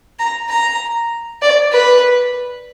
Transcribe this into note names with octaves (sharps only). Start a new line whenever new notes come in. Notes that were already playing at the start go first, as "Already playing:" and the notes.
A#5
A#5
D5
B4